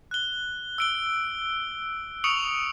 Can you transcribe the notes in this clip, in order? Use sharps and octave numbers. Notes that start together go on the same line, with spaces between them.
F#6 G7
E6 D7 G7
C#6 D#6 C#7 D7 F7 F#7